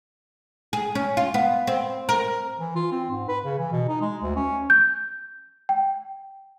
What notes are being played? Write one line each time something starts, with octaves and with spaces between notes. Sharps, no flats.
G#4
C#4
F4
B3
C4
A#4
E3
F4
C4
G#2
B4
C#3
E3
B2
D#4
G#3
D2
C#4
G6
G5